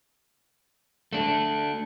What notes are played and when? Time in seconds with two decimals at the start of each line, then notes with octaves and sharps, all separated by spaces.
1.13 A3 D4